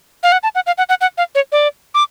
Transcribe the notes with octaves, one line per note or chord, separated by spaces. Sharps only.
F5
F#5
A5
F#5
F5
F#5
F#5
F#5
F5
C#5
D5
D6